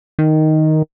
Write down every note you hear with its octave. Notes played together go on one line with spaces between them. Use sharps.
D#3